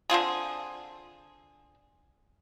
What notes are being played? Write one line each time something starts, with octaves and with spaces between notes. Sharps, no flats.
D3 C4 F4 G#4